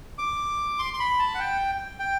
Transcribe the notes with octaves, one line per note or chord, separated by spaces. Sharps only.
D6
C6
C6
B5
A5
F#5
G5
G5